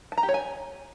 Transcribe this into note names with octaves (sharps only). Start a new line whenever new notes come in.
A5
A#5
G4
C#5
G#5